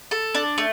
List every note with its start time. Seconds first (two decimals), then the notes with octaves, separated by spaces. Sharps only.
0.11 A4
0.35 D4
0.58 A3